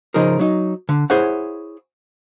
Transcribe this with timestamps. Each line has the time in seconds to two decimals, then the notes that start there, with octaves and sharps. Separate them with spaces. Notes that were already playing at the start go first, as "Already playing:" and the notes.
0.14 C#3 F3 D#4 G#4 A#4
0.39 F#3 D#4
0.89 D3
1.10 E4 G#4 C5 C#5 F#5